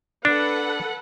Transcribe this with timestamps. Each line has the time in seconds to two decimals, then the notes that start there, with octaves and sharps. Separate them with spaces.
0.25 D4 A4 B4 F#5